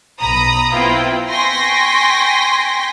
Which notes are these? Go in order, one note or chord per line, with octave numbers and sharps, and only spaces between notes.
B1 A#5 B5 D#6
B3 C4 E4 F4 B4 G5
G5 G#5 C6 C#6 A#6 B6